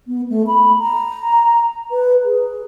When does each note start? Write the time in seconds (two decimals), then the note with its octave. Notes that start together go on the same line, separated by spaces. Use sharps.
0.07 B3
0.30 A3
0.47 B5
0.79 A#5
1.91 B4
2.24 G#4